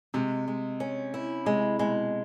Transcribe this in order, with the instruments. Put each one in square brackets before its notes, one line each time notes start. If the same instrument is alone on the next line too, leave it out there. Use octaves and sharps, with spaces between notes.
[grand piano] C3 [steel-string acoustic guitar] G#3
[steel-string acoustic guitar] G#3
C#4
E4
[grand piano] C3 [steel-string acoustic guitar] G#3
[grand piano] B2 [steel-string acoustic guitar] G#3